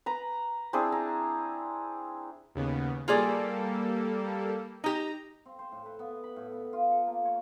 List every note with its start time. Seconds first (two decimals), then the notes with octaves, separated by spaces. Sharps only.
0.06 B4 A#5
0.73 C4 D4 E4 G#4
0.92 A#5
2.55 D#2 C#3 B3
3.08 G3 A#3 F4 G#4 A4 D5
4.84 D#4 G4 A#5
5.46 C4
5.59 C5
5.72 A2
5.86 B4
5.99 B3
6.24 B5
6.36 A2
6.52 B3
6.73 F4
6.91 A4
7.07 A#3
7.25 C#5